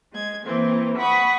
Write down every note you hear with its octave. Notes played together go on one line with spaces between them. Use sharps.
G#3 G#6
E3 A#3 C4
F#5 B5 C#6 D#6